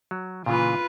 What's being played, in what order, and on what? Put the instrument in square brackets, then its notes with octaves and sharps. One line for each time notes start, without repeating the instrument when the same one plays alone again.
[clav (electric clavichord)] F#3
[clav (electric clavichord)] A#2 C#3 E3 [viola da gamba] F4 B4